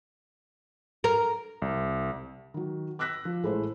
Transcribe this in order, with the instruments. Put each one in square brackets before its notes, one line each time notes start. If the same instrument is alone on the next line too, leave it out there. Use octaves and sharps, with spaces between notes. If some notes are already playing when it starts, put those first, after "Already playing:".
[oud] A#4
[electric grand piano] C2
[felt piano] D#3 F#3
D6 E6 F#6 A#6 B6
F3
A1 G#3 A3 E4 A4 C5